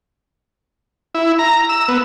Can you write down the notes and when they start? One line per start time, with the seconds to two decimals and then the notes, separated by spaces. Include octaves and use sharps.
1.14 E4
1.39 A#5
1.69 E6
1.88 B3